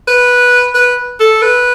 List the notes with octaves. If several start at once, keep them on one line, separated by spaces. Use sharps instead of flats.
B4
B4
A4
B4